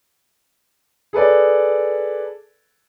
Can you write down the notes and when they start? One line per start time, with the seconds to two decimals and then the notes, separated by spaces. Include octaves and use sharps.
1.13 G#4 A4 B4 D5